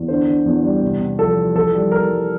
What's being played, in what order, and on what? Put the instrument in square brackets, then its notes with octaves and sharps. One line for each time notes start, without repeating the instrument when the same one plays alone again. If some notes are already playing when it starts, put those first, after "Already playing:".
Already playing: [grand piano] E2
D3 C5
D3
E2
G3
C3
C3
F3 A4
F3
E3 A4
G3
E3 A#4
G3